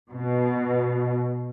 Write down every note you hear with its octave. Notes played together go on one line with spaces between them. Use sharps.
B2